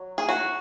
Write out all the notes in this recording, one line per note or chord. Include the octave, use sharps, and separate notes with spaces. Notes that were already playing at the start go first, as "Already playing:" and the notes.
Already playing: F#3
G#4
F#4